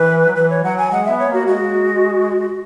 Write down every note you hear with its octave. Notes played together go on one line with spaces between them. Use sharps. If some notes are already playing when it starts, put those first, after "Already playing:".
Already playing: E3 B4
F#3
E3 B4
C#5
F#3 F#5
G#5
G#3 F#5
B3 E5
C#5
A#3 F#4
G#3 F#4